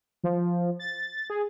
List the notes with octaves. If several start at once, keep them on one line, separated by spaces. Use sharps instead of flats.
F3
A6
G#4